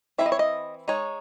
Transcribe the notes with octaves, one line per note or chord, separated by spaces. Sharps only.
E3 C4 E4 E5
D#5
C#5
D#5
G#3 D#4 C#5